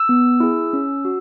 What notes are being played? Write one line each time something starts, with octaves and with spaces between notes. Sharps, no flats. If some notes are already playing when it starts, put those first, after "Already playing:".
Already playing: E6
B3
E4 G#4
C#4
F#4